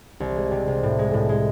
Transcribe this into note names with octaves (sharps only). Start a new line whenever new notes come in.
C2
G#3
C3
C3
A2
G#3
A2
G#3